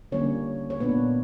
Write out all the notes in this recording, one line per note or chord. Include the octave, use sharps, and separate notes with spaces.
D3 G3 A#3 C#4 D4 C#5
C#5
A#2 A#3 B3 D4 B4